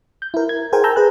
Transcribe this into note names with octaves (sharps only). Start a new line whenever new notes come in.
G6
E4 A#4
G#6
G#4 A#4 C5 G5 G#5
A5 A#5 E6 G6
G#4 B4 F#6